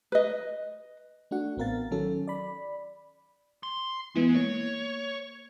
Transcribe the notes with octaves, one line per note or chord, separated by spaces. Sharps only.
B4 D#5
A3 D4 F#4 F#5
A1 B3 C4 A#4 F5 A6
D#3 F#3 C#4 A4
D5 B5
C6
E3 G#3 B3 E4
A#3 C#5